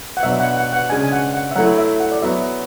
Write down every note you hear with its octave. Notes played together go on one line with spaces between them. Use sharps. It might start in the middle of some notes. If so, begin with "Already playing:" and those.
F#5
B2 F#3 B3 D4 F#4 E5
F#5
F#5
F#5
C#3 G#3 D4 G#5
G#5
F#5
F#5
E5
F#3 A3 E4 F#5
E5
F#5
D5
F#3 B3 F#4 E5